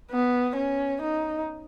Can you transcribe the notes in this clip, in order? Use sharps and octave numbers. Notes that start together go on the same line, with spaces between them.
B3
C#4
D#4